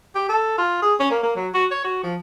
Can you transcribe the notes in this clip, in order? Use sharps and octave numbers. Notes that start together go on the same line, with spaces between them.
G4
A4
F4
G#4
C#4
A#3
A#3
F#3
F#4
C#5
F#4
F3